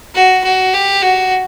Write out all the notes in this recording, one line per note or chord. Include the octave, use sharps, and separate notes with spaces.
F#4
F#4
G4
F#4